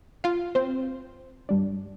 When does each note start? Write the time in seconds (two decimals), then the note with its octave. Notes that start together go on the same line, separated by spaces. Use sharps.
0.24 F4 F5
0.55 C4 C5
1.49 G2 G3 D4